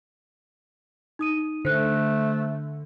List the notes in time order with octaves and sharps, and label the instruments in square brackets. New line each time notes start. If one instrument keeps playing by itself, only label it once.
[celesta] D#4 D#6 D#7
[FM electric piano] D3 [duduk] A3 [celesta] C5 F#6